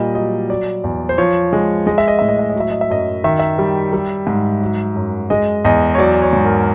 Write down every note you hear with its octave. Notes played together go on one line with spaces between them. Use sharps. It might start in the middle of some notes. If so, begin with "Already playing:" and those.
Already playing: A#2 G3 D#5
F#3 D#5
F#3 D5
E2
C5
F3 C#5
G#3
G#3 D#5
E5
D#5
A2 E5
D#5
E5
D#5
F#3 E5
D#5
E5
F#2 D#5
D#3 E5
E5
G3
G3
G#2
F#3
F#2
G#3 D#5
E2 D#5
C#5
F#3 D5
C#5
G#2
A#4